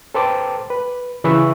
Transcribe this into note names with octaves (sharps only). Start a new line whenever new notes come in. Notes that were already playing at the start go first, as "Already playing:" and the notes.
A4 B4 C5 G5 A5 D6
B4
C#3 E3 G#4 B4 C#6 E6